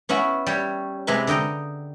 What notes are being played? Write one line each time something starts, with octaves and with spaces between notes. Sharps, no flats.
B3 C#4 E4 F#4
G3 C#5
C3 G#3 E4 B4
D3 D#5 G5 A#5